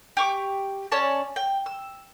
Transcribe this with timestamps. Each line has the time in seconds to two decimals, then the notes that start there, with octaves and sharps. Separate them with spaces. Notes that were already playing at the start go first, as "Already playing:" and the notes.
0.17 G4 C#6 D6
0.92 C#4 C#5 D5 A5
1.36 G5
1.66 E6